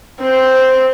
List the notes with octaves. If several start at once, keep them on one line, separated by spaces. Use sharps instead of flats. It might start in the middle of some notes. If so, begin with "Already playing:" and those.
C4 C5